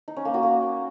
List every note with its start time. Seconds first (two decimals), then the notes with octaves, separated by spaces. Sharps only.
0.08 D#4
0.16 C#4
0.25 A#3
0.34 F#4
0.43 A#3